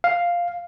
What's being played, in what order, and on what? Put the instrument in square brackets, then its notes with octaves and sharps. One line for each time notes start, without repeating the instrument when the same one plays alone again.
[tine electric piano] F5